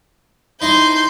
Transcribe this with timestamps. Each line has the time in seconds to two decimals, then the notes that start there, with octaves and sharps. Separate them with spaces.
0.62 D#4 E4 D#5 C6 G6